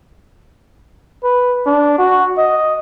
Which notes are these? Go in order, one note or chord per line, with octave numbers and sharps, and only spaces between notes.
B4
D4
F#4
D#5